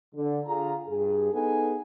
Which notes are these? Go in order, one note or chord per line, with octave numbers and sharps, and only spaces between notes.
D3
D3 F4 G#4 A#5
G2 G#4
B3 D#4 G#4 A4 G#5